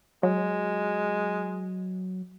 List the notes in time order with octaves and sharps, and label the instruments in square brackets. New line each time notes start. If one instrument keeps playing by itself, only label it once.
[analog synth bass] F#3 [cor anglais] G#3